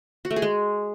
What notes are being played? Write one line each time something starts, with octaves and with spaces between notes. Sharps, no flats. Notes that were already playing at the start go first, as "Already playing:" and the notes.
F#4
A3
G#4
G#3